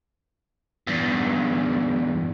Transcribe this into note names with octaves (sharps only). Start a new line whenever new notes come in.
E2 G2